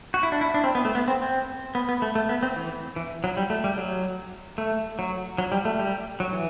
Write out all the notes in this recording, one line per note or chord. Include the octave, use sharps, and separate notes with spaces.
F#4
E4
D4
E4
D4
C4
B3
A3
B3
C4
C4
B3
B3
A3
A3
B3
C4
E3
E3
F#3
G3
A3
G3
F#3
A3
F#3
F#3
G3
A3
G3
F#3
E3